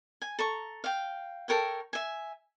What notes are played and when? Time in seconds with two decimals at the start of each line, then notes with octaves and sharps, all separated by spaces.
0.22 G#5
0.39 A4 A#5 C#6
0.84 F5 G5
1.48 A4 A#4 C#5 G5
1.93 E5 G#5